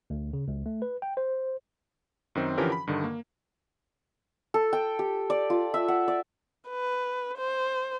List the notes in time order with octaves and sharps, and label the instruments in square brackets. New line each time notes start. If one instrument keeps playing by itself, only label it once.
[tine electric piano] D2
C#3
C#2
A3
B4
G5
C5
[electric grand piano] F#2 D#3 C4
D3 E3 F3 C#4 G4 A#4
B5
G2 D3 D#3
A#3
[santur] A4
G5
G4
D5
F4
E5
F#5
D5
[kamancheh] B4
C5